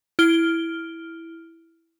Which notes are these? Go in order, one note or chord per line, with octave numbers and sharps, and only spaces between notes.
E4 F6 D7 G7